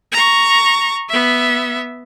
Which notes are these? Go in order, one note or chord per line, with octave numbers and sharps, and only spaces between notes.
A#5 C#6
B3 E5